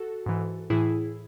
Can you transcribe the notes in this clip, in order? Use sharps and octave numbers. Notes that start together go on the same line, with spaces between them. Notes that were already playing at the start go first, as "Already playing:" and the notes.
Already playing: F#4 A4
G#2 E3
A2 E3 E4 G#4